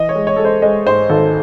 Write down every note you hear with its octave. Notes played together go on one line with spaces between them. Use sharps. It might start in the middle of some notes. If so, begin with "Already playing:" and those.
Already playing: E3 D#5
C#5
G#3
C#5
G#3 A4
C5
G#3 D#5
G#2 C5
G#1 A4